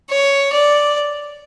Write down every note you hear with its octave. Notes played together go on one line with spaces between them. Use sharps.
C#5
D5